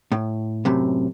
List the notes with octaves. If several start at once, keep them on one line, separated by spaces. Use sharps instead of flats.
A2
F#2 A2 C3